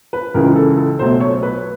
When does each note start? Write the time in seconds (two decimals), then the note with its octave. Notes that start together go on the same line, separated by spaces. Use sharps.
0.13 B4
0.34 C#2 C#3 E3 A#4
0.55 A4
0.77 A4
0.99 B1 B2 F#3 A3 C5
1.21 C#5
1.43 B4